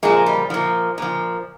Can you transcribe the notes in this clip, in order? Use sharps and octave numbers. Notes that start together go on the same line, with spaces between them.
A#2 F3 G#3
G3
A#2 F3
A#2 F3